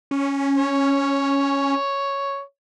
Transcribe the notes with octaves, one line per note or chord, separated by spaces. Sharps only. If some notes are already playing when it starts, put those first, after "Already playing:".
C#4
C#5